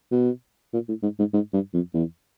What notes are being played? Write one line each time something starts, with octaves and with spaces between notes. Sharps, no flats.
B2
A#2
A2
G#2
G#2
G#2
G2
F2
E2